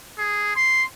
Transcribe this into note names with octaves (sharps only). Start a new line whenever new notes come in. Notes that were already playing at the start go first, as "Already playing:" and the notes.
G#4
C6